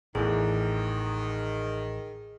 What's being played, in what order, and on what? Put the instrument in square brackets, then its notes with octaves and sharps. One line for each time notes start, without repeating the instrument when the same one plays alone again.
[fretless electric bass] A1 [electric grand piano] E2 A2 [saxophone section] D#3 [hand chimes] G#4